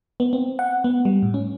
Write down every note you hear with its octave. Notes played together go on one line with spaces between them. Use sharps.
B3
C4
F#5
B3
G3
A2
C#4